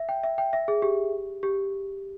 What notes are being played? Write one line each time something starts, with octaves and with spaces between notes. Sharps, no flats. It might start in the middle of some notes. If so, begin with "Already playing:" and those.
Already playing: E5
G5
E5
G5
E5
G#4
G4
G4